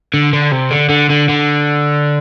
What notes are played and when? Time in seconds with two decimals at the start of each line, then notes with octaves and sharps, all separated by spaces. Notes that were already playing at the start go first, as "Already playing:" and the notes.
0.14 D3
0.33 D3
0.52 C3
0.71 D3
0.90 D3
1.10 D3
1.29 D3